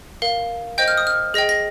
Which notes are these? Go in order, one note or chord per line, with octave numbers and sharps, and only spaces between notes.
A#4 F5
C5 D#5 G5 G6
F6
D#6
F6
G#4 D#5 G5 A#6
A#6